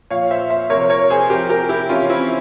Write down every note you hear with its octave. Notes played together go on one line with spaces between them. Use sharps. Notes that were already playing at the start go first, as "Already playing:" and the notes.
A#2 F3 C#5 F5
C5 E5
C5 E5
C3 F3 A#4 C#5
A#4 C#5
G#4 C5
C3 F3 G4 A#4
G4 A#4
E4 G4
C3 E3 C#4 F4
C4 E4